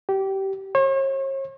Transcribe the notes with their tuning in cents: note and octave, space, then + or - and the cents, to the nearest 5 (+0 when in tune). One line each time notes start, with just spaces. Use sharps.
G4 -20
C#5 -45